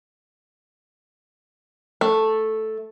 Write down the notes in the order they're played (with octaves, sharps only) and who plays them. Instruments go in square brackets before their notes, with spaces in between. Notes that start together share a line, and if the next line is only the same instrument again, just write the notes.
[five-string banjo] A3